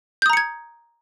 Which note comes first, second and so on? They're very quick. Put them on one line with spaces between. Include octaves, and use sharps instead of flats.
G6 D#6 A#5 C#7 G#6